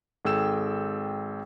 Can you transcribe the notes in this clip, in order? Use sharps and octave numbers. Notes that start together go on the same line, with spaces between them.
G#1 G#4 A4 G5 E6 E7